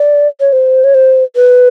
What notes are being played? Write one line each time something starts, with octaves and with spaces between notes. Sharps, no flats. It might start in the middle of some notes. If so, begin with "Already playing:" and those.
Already playing: D5
C#5
C5
C#5
C5
B4